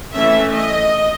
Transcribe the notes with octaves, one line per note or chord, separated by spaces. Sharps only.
E3 A3 C#4 E5
D#5